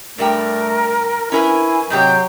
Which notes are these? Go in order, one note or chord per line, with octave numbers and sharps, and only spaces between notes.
G2 G3 A3 A#4 G5
C#4 E4 A#4 B4 G#5
G#2 C3 F#3 G4 G6